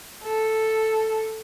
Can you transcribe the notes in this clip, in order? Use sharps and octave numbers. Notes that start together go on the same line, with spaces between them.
A4